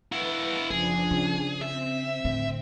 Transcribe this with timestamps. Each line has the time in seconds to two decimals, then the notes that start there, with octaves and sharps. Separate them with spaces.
0.12 E4 F#4 B4
0.70 F#1 F3 D4 G#4
1.11 C#3
1.61 C4 E5
2.25 A2 D3